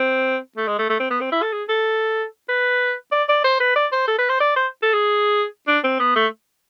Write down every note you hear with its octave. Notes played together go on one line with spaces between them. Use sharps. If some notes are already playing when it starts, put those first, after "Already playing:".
Already playing: C4
A3
G#3
A3
A3
C4
B3
C4
E4
A4
G#4
A4
B4
D5
D5
C5
B4
D5
C5
A4
B4
C5
D5
C5
A4
G#4
D4
C4
B3
A3